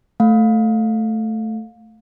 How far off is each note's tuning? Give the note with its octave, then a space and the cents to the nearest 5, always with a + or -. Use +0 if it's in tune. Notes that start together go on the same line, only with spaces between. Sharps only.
A3 +0 F5 +20